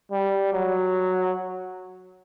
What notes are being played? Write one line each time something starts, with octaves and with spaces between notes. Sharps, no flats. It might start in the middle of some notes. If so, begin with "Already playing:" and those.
G3
F#3